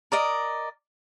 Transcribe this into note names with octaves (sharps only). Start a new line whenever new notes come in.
A#4 D5 D#5